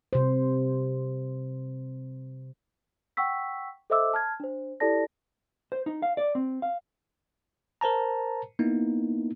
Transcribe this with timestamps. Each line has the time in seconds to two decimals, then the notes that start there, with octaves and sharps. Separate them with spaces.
0.13 C3 C5
3.17 F#5 G5 C#6 E6 B6
3.90 A4 C5 D#5 E5 D6 E6
4.13 A5 F6 G#6
4.40 D4 C5
4.80 E4 G4 A4 D5 A5 A#6
5.72 C5
5.86 D#4
6.02 F5
6.17 D5
6.35 C4
6.62 F5
7.81 A#4 C5 A5 A#5
8.59 A#3 B3 D#4 E4